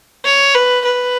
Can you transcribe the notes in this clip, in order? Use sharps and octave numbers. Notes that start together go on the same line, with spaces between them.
C#5
B4
B4